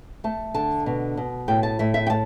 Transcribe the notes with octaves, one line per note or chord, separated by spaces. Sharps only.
A3 A5
D3 A5
B2
B2
A2 G5
A5
A2 E5
E5
G5
A2 A5